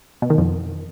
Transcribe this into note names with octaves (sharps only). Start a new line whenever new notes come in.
B2
D#3
F2